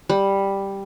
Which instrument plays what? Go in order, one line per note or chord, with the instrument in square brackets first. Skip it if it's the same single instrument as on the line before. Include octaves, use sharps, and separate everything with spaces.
[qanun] G3